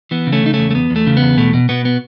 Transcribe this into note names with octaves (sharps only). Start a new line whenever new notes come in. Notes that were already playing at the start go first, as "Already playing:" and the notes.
E3 B3
C#3
A3 C#4
C#3 D#4
E2 A3 C#4
A3
E2 B3
E2
A3
C#3
E2 B3
B2 A3
B2
B2 B3
B3